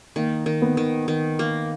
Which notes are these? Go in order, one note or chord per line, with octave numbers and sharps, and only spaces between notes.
D#3 A#3
D#3
B3
D#3
D#3
A#3